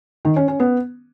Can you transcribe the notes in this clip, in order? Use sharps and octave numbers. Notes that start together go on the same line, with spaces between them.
D#3
C#4
C#4
B3